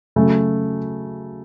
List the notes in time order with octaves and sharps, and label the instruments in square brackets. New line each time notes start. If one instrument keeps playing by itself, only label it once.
[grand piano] C#3 F#3 A3